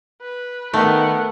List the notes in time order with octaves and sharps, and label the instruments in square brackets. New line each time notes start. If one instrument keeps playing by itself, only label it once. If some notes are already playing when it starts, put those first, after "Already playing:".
[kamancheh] B4
[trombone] D#3 [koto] A3 [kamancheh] B3 A#4